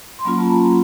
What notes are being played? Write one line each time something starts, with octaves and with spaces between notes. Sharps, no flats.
C6
F#3 A#3 C#4 F4 B5
A5
A#5